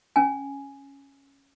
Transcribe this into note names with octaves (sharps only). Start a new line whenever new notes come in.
C#4 G#5